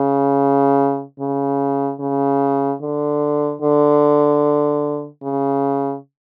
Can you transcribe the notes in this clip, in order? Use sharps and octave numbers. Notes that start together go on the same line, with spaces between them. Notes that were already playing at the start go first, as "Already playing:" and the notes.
Already playing: C#3
C#3
C#3
D3
D3
C#3